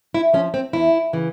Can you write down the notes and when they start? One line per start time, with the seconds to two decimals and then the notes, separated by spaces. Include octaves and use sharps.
0.14 E4
0.33 F3 C#4
0.54 C4
0.73 E2 E4
1.13 C#3 E3